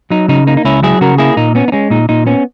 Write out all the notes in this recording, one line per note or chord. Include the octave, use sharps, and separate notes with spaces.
F#3 D#4
C#3 D#4
A#3 D#4
D#4
C#2 C#4 E4
F#3 E4 G#4
C#3 F#4 A#4
A#3 E4 G#4
A#2 D#4
B3 C#4
D#4
G#3 C#4
A#2 D#4
A#2 D#4
B3 C#4